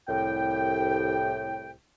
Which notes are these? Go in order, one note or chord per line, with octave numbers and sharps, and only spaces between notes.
C2 A2 G5